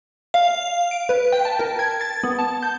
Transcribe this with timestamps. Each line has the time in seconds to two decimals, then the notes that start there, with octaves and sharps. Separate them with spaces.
0.34 F5
0.91 D7
1.09 B4
1.32 G5
1.45 A5
1.59 A#4
1.79 G#6
2.01 A6
2.24 B3
2.39 A5
2.63 G6